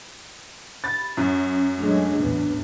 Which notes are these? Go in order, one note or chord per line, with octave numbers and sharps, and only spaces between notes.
B5 A6
F#2 C#4 A#5
F#3 G#3 A3 D4
A1 E2 B3